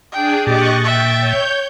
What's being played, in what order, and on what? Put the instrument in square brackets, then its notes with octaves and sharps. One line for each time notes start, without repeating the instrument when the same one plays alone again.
[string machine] D4 G#4 [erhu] G5
[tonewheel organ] A#2 A6 [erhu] G4 [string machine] D#5 C#6 F#6
[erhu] E5 [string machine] G5
[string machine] C#5 G6